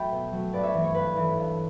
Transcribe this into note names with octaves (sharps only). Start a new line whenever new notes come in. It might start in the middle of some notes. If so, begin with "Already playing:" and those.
Already playing: F#3 A3 E5 G5 A5 B5
B2
F#3 A3
G2 B4 D5
C#5 E5
E3 A3
C#5
G2 B4
E3 A3
G2